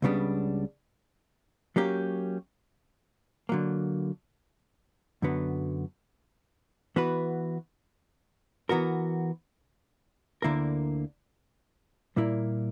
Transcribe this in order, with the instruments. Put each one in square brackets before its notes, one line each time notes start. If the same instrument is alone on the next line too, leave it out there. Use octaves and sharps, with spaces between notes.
[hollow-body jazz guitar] C#2 C#3 G3 B3 D4
F#3 A#3 C#4 G4
D3 F#3 A#3
F#2 D3 F#3 B3
E3 B3 F#4 B4
E3 B3 F#4 A#4
D2 D3 A#3 E4 A#4
A#2 G3 A#3 E4 A#4